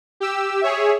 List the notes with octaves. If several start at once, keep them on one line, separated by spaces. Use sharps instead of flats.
G4 E6
G#4 C#5 E5